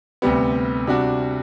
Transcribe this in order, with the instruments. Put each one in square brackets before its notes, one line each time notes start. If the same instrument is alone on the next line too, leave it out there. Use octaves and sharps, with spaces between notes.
[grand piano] D2 C3 G3 B3
C3 G3 D4 F#4